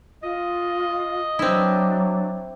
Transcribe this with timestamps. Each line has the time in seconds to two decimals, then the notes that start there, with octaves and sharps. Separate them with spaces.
0.23 F4 D#5
1.39 F#3 C4 D4 E4